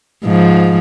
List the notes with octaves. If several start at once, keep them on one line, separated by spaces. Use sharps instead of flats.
G#2 F3